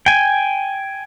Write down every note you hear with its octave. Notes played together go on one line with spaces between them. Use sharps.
G5 G#5